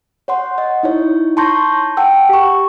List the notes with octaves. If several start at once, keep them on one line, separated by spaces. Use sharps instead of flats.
C#5 F#5 C6
D#5
D#4 E4 C#5
A5 A#5 C6 C#6 G6 A#6
F#5 G5 A5 E6
G4 C#6